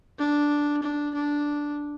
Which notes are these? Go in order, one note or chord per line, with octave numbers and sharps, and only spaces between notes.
D4
D4
D4